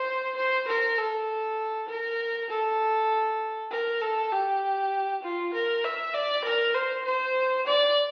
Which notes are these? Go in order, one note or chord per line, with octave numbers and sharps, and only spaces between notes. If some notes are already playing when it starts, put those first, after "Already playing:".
Already playing: C5
C5
A#4
A4
A#4
A4
A#4
A4
G4
F4
A#4
E5
D5
A#4
C5
C5
D5